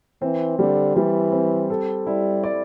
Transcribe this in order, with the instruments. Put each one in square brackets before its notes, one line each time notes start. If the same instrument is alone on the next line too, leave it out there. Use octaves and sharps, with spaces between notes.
[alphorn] E3 [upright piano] C4
[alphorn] D3 [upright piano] G3
[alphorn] E3 [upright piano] G3
[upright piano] C4
A4
[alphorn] G3 [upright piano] E4
[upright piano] D5